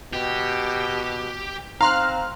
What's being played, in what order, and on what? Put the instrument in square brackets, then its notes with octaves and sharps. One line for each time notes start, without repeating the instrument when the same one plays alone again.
[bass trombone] B2 [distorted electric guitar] G4
[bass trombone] C4 [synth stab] F5 F6 F#6 [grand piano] A#5 C6